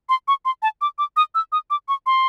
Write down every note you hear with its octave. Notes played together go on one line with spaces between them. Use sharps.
C6
C#6
C6
A5
D6
D6
D#6
E6
D#6
D6
C#6
C6